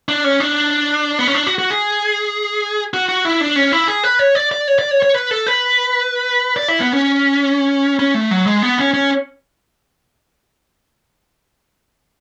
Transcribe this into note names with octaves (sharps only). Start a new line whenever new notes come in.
D4
C#4
D4
B3
C#4
D4
F#4
F#4
G#4
F#4
F#4
E4
D4
C#4
E4
G#4
B4
C#5
D5
D5
C#5
D5
C#5
C#5
B4
A4
B4
D5
E4
B3
C#4
C#4
A3
F#3
G#3
B3
C#4
C#4